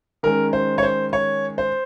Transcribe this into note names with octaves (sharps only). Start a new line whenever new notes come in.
D#3 G#3 C#4 A#4
C5
C#5
C5
C#5
C5